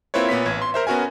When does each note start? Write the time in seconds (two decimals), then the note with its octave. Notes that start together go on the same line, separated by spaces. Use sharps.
0.14 A#3 C4 E4 F4 B4 C#5
0.29 A#2 B3 C#5 B6
0.46 A1 G#6
0.62 C6
0.74 A#4 C5 E5
0.87 B3 C#4 F#4 A#4 G#5